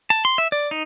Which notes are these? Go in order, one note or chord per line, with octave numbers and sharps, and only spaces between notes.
A5
C6
E5
D5
D#4